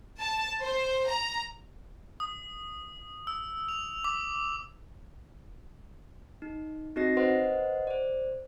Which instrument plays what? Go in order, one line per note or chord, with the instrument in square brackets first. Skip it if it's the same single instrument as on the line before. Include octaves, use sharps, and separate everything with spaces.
[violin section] A5
C5
A#5
[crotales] D#6
E6
F7
D6
[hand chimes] D#4
C4 D#4 F#4 D#5 A#6 C7
B4 C5 D#5 F#5 C6
C5 D5